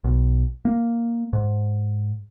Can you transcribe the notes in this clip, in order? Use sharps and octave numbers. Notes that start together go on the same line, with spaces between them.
B1
A#3
G#2